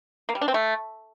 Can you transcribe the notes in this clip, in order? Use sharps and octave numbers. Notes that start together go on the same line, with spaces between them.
A#3
G3
D4
C4
A3